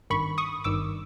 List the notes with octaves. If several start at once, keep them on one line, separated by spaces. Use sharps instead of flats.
G#1 G2 D#3 B5 C#6
C#6 D#6
G#1 G2 D#3 D6 E6